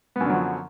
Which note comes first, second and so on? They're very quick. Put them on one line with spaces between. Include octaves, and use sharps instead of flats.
B3 F#2 D3 F#3 F3